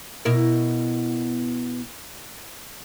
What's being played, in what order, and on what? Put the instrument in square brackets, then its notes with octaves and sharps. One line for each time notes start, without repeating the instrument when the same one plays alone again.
[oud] B2 E4 A#4